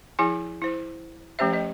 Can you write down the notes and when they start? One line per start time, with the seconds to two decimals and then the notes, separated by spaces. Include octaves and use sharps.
0.19 F3 E4 G#4 G#5
0.62 E4 C5
1.39 F3 A3 C#4 G4 C5 E5
1.53 A3 D#5